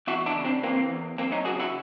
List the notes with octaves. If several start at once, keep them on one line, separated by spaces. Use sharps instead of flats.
E2 E4 F#4
D4 E4
C#3
C4 D4
E3 A#3 C4
E2
F#2 A#3 C4
C#4 D#4
C#3 F#4 G#4
E4 F#4